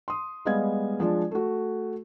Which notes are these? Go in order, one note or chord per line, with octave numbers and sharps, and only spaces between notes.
C6 D#6
G3 G#3 B3 D#5 F5 G#6
F3 G#3 D4
A3 F#4